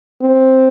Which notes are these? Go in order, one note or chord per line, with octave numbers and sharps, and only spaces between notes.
C4